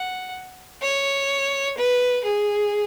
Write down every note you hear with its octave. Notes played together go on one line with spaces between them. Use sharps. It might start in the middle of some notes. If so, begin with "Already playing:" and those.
Already playing: F#5
C#5
B4
G#4